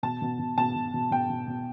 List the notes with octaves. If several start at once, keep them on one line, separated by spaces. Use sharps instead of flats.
B2 A5
B2
B2
B2 A5
B2
B2
B2 G5
B2
B2